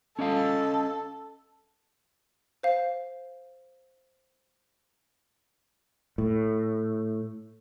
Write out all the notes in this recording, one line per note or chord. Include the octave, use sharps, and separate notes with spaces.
C#4 A4 D#5 F5
C5 F5
A2